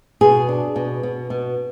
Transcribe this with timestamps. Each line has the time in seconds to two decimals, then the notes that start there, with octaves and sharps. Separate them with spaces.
0.21 B2 G#4
0.49 D4
0.76 B2
1.03 B2
1.30 B2